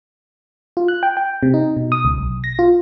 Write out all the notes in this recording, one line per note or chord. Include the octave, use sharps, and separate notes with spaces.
F4
F#6
G5
G5
C3
D#4
B2
D#6
C#2
B1
A#6
F4